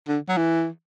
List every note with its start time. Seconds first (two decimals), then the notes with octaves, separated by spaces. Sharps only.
0.08 D3
0.29 F#3
0.37 E3